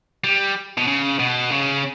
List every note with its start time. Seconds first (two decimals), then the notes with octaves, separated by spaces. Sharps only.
0.24 G3
0.78 B2
0.87 C#3
1.19 B2
1.50 C#3